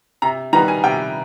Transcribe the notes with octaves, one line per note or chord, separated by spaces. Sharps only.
C3 A#5
D#3 G3 B3 A#5
G#5
C3 G5